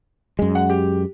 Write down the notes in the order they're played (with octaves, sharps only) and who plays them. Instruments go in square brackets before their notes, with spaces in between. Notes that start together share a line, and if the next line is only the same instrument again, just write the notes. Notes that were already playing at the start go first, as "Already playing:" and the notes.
[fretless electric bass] F#2 G#3
[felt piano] F#5
G4